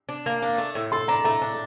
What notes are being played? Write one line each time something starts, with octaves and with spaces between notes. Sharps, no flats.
D4
A#3
D4
A3
A2
A4 C6
D4 A#5
A3 A#5
D4